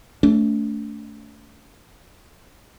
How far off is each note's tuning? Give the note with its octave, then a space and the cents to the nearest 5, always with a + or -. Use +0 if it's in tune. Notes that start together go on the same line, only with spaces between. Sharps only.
A3 +0 D4 -45